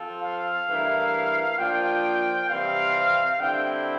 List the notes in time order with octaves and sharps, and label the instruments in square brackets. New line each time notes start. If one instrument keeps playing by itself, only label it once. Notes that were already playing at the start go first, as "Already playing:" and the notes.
Already playing: [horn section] F3 C4 F4 A4
[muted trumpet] F5
[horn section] G2 E3 A3 E4 A#4
[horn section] F3 A#3 D4 F4 [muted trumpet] G5
[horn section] C3 E3 G3 C4 [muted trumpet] F5
[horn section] D3 G3 C4 E4 [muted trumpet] G5